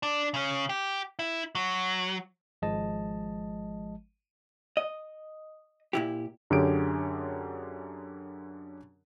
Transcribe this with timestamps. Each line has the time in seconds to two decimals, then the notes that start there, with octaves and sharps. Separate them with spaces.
0.03 D4
0.34 C#3 C#4
0.69 G4
1.19 E4
1.55 F#3
2.62 G#1 F3 G#3 D#5 A5
4.77 D#5
5.93 A#2 E4 G4
6.50 F#2 D3 C#4 G4 G#4 D7